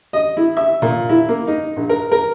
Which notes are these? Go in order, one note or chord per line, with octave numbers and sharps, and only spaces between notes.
D#5
E4
E5
A#2
E4
A#3
D#4
A#1
A#4
A#4